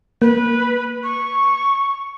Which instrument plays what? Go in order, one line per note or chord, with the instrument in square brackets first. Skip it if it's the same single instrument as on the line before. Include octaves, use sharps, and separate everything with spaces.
[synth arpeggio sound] A#3 [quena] B4
[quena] C#6